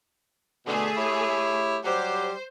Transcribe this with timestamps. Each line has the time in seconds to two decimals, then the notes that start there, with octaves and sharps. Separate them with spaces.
0.67 B2 D3 A3 G#4
0.97 E4 G4 C#5
1.85 F#3 G3 G4 C5